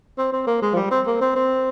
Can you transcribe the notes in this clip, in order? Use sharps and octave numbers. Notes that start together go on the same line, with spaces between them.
C4
C4
A#3
G#3
F3
G3
C4
A#3
C4
C4